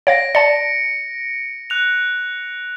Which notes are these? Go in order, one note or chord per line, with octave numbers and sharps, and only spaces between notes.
C#5 F5 A#6 D7
D5 A5 C#7
F#6 F7